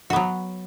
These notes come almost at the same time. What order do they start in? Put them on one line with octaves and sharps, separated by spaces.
F#4 B3 F#3